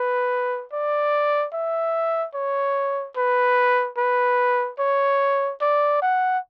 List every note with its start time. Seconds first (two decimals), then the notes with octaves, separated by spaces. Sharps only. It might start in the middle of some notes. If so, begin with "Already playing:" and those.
Already playing: B4
0.73 D5
1.53 E5
2.34 C#5
3.16 B4
3.97 B4
4.79 C#5
5.61 D5
6.02 F#5